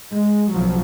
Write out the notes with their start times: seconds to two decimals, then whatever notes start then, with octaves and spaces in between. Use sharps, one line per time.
0.11 G#3
0.52 B1 C#3 F3 F#3